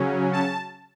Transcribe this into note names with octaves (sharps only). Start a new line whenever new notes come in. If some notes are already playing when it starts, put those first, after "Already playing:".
Already playing: C#3 F#3 C#4
A5